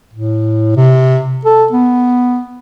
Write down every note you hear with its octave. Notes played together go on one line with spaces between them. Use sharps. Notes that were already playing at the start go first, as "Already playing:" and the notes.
A2
C3
A4
B3